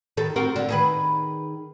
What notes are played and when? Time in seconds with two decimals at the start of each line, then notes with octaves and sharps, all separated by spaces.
0.17 D#3 A4
0.36 C4 F#4 A#4
0.56 D3
0.69 D#3 G#4 B4